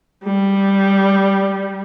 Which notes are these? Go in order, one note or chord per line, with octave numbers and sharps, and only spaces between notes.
G3